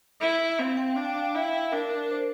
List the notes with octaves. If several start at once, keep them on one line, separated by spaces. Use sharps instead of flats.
E4
C4 F5
G5
D4 F5
G5
F5
E4
D4 A#4
C5